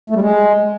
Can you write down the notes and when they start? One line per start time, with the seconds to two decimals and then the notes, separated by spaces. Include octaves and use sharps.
0.10 A3
0.16 G3
0.21 G#3